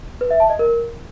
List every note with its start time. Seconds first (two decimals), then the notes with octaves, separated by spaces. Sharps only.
0.21 B4
0.31 E5
0.40 A5
0.50 D#5
0.59 A#4